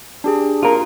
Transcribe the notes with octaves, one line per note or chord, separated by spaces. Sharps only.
D4 G4 G#4
F4 A#4